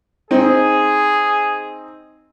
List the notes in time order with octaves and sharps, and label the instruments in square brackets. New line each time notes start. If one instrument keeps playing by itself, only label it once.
[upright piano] C4 D#4 [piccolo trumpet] G#4